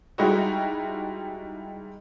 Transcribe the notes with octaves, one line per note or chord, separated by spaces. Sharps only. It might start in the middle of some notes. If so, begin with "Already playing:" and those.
G3 G#3 D#4 E4 F#4